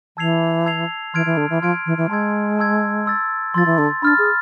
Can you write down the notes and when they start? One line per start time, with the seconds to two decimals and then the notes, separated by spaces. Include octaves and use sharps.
0.17 E3 A5 E6 G#6 C7 F7
0.65 A5 E6 G#6 C7 F7
1.14 E3 C6 F6 G#6 D7
1.26 E3
1.37 D3
1.50 E3
1.62 F3 C6 F6 G#6 D7
1.86 E3
1.97 E3
2.10 G#3 A5 C6 E6 G#6
2.58 A5 C6 E6 G#6
3.06 C6 E6 A6
3.54 F3 C6 E6 A6
3.66 E3
3.78 D3
4.02 D4 B5 F6 A6
4.18 G#4